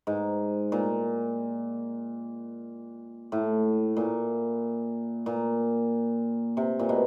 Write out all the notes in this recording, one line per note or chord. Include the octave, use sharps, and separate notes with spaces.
G#2
A#2
A2
A#2
A#2
C3
A#2
B2